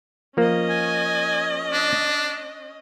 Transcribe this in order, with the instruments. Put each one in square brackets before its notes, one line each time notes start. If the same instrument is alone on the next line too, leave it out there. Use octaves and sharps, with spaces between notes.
[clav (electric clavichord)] F3 A#3 [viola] C#4 D#5
[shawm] G#5
D4